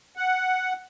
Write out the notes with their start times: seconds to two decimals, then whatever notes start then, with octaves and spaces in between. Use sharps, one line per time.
0.17 F#5